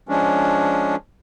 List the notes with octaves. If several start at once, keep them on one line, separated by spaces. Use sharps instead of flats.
F3 G#3 C#4 D4